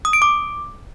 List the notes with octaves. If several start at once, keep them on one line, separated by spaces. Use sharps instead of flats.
D#6
D7
D6